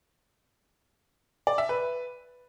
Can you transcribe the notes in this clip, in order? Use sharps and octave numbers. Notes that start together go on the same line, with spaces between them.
D5
E5
B4